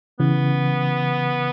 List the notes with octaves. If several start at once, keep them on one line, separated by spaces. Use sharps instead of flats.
C#3 E3 B3